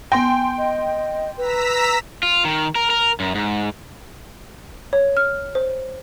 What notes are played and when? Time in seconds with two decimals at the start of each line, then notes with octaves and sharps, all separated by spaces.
0.12 B3 G5 G#5 C6 A#6
0.58 D#5
1.38 B4 A#5 E6 B6
2.23 F4
2.45 D#3
2.76 A#4
2.90 A#4
3.20 F#2
3.35 G#2
4.93 C#5
5.17 F6
5.55 C5